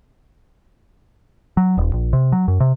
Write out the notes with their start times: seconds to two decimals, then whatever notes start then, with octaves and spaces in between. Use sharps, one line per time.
1.57 F#3
1.78 D#1
1.93 A#1
2.13 C3
2.32 F#3
2.48 F#2
2.60 C3